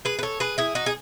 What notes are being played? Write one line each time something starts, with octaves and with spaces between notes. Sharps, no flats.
G#4 B4
B4
A4 C#5
G#4 B4
E4 G#4
D#4 F#4
G#4